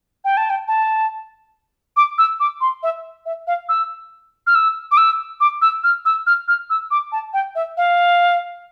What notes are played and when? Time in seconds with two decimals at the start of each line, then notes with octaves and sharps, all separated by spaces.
0.25 G5
0.37 A5
0.50 G5
0.68 A5
1.97 D6
2.18 E6
2.40 D6
2.61 C6
2.83 E5
3.26 E5
3.47 F5
3.69 E6
4.47 F6
4.55 E6
4.91 D6
4.97 E6
5.41 D6
5.62 E6
5.84 F6
6.05 E6
6.27 F6
6.48 F6
6.70 E6
6.91 D6
7.12 A5
7.33 G5
7.55 E5
7.77 F5